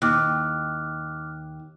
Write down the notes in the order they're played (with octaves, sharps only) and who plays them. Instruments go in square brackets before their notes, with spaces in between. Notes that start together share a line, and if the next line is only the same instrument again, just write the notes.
[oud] D#2 [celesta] D6 F6 F#6